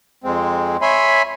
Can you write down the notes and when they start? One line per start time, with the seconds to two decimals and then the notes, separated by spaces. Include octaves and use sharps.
0.24 F2 G#3 C4
0.82 C#5 E5 G#5 B5 C6